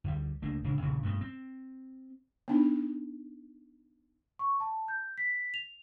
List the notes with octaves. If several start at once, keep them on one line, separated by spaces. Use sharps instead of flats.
D2 G3
C#2 A3 A#3 D4
D1 C#2 C#3 D4
A#1 D#2 C#3 E3
G2 B2 E3 A3
C4
B3 D4 D#4
C#6
A5
G6
B6
F7